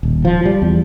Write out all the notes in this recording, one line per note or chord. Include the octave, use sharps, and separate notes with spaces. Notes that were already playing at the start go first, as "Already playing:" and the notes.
D#1
F3
G3
E2